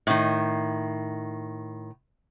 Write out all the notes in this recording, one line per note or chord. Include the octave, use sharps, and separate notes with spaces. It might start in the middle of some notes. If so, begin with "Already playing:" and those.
A2 D#3